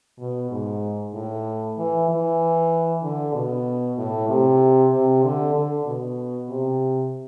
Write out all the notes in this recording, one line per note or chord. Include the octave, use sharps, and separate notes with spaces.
B2
G#2
A2
E3
E3
D3
B2
A2
C3
C3
D3
D3
B2
C3